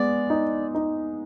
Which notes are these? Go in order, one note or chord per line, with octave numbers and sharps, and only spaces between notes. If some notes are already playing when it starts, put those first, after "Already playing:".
Already playing: G#3 B3 D5
D#4
D#4